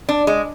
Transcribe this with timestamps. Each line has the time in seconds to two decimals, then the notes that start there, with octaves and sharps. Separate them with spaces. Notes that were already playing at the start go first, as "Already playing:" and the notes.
0.09 D4
0.27 G#3